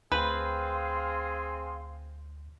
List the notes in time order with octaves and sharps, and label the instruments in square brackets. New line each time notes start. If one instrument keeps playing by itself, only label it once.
[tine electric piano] D2 G6 [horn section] C4 G#4 [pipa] B4 [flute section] F5 C6